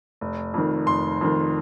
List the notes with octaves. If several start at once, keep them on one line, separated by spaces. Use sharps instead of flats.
F1
F2 D#3
F1 C6
F2 D#3